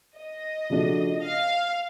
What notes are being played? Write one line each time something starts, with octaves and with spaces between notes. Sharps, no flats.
D#5
C#3 F3 A3 D4 F#4
F5